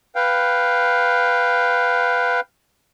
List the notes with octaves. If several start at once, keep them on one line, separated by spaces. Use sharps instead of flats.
B4 F5 G5